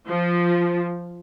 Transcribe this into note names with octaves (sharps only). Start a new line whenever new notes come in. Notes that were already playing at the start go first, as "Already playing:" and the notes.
F3